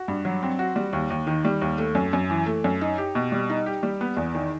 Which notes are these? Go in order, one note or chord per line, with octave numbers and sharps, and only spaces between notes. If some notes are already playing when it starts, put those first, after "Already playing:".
Already playing: F#4
G2
F#3
C4
F#4
G3
D#2
D#2
D#3
G3
D#2
A3
F#2
F#2
E3
A3
F#2
D#4
G4
B2
G3
D#4
G4
G3
B3
E2
D#3